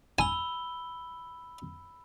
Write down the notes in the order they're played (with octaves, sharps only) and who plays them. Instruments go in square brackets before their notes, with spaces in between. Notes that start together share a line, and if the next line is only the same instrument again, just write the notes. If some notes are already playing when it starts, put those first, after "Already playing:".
[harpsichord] G#5 [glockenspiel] B5 E6 G7